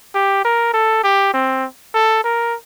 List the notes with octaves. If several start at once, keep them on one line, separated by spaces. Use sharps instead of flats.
G4
A#4
A4
G4
C4
A4
A#4